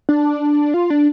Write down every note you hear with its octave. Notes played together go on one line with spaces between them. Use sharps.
D4
F4
D4